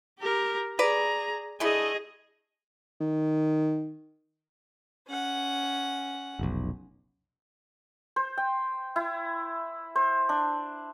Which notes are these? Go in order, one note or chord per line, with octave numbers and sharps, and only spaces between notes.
G4 A#4
G#4 B4 D5 A#5
D3 A3 E4 G#4 D#5
D#3
C#4 F#5
F1 B1
C5
G5
E4
C5
D4